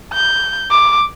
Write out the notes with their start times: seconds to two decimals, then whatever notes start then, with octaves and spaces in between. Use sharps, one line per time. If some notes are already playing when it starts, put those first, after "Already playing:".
0.14 G6
0.71 D6